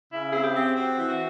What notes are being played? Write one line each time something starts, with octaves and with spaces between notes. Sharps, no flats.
C#3 E4
C4 G#4
G4
C4
C4 F#4
E3
F#4